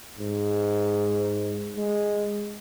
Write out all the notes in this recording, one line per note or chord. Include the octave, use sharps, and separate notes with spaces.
G#2
G#3